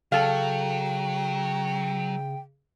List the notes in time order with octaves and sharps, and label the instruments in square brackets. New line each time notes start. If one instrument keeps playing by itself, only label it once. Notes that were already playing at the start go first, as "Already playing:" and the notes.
[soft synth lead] C#3 [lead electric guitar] F#3 [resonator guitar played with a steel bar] A4 F5 [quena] G5